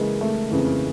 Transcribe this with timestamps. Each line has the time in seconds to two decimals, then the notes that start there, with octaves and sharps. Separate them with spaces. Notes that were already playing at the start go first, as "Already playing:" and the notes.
Already playing: C#3 E3 G#3 A#3
0.21 A3
0.51 F2 C#3 E3